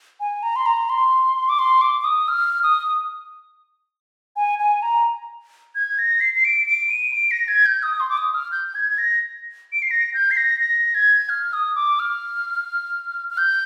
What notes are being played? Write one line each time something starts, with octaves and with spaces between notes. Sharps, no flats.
G#5
A#5
C6
A#5
C6
D6
C6
D6
D6
D#6
F6
D#6
G#5
G#5
A#5
G#6
A#6
C7
C7
D7
D7
D#7
D7
A#6
G#6
G6
D#6
C6
D6
D#6
F6
G6
G6
G#6
A#6
D7
C7
A#6
G6
C7
A#6
A#6
G#6
F6
D#6
D6
F6
F6
G6